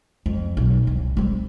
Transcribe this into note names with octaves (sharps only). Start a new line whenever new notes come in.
F2
B1
C2
G3 C4